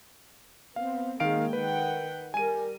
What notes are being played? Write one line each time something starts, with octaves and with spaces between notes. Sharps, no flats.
B3 C4 F5
D#3 G#3 A#3 F5 D7
D#3 B4 F#5 G5
G3 A#4 G#5 D#7